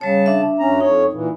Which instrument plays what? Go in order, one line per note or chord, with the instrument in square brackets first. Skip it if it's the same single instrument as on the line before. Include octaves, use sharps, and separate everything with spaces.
[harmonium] C#3 A5 [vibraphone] G3 C#5
[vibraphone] D4 E5
[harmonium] F#2 C#4 A#5
[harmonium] F2 C#5 [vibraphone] D#4
[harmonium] A#2 E3